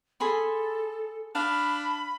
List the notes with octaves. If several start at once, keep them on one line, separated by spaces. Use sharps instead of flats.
G#4 A4 B5 C6
D4 F5 B5